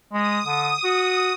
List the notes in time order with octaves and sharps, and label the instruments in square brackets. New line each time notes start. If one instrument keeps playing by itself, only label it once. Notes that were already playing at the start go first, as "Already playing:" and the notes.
[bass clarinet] G#3 [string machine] D#6
[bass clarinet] D3
F#4